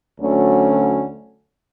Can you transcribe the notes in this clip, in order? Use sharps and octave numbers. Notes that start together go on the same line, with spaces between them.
D2 D3 F#3 A3 C#4